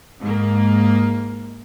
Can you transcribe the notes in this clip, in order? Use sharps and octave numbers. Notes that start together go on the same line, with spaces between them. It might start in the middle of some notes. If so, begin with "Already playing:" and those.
G#2 A#3